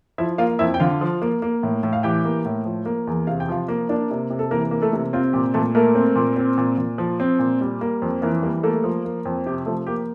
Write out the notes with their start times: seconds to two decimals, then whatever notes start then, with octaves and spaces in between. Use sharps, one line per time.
0.18 F3 E4 E5
0.38 A#3 F4 F5
0.59 F2 E4 E5
0.74 G5
0.80 D3 F4 F5
1.01 F3
1.22 A#3
1.42 A#3
1.63 A2
1.83 A2
1.93 F5
2.03 E3 G4 G5
2.25 A#3
2.46 A2
2.65 F3
2.86 A#3
3.07 E2
3.27 C3 F5
3.40 G5
3.49 F3 F4 F5
3.68 A#3
3.89 A#3 D4 D5
4.10 C3
4.30 C3
4.39 A4
4.51 E3 A#3 A#4
4.71 A#3
4.82 A3 A4
4.93 C3
5.13 C4 F4
5.33 A#2 G4
5.54 A#2 A3 A4
5.75 A3 A#3 A#4
5.95 C4
6.15 A#2
6.37 C4
6.58 A#2
6.78 A#2
6.98 F3
7.20 C4
7.39 A#2
7.61 G3
7.81 A#3
8.02 F2
8.22 E3 A#3 A#4
8.42 G3 A#3 A#4
8.63 A3 A#3 A4
8.84 F3
9.05 A#3
9.25 F2
9.46 C3 G4
9.66 F3 A3 A4
9.87 A#3 G4